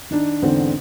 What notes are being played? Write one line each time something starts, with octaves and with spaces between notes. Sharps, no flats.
D#3 D4 D#4
E2 G#2 D3 C4 D4